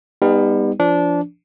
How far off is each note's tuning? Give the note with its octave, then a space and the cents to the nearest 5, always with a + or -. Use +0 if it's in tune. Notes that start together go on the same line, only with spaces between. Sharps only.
G3 +30 B3 +0 D#4 +0
F3 -20 D4 -20